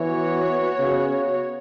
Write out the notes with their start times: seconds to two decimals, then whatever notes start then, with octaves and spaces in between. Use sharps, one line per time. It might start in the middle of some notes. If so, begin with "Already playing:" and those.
Already playing: E3 B3 F#4 C#5
0.79 C#3